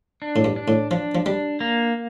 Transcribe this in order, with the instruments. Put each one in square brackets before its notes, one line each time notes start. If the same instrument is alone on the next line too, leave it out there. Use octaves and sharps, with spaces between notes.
[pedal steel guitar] D4
[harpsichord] A2
G2
[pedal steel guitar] D4
[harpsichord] A2
[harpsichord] F3 [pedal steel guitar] D4
[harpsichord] F3
[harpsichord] G3 [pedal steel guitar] D4
[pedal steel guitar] A#3